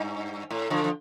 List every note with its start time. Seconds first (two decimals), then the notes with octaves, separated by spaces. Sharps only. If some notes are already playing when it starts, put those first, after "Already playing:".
Already playing: G2
0.50 A2
0.70 D3 F3
0.84 F3